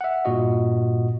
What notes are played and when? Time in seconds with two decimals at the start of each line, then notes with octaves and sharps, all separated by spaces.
0.01 E5 F#5
0.25 G2 A#2 F4 F#4 D#5